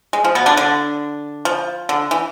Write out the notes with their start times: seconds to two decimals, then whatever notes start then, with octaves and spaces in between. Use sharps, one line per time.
0.13 G#3
0.24 F3
0.35 B2 B3
0.46 D3 D4
0.57 D3 D4
1.45 F3
1.89 D3
2.11 E3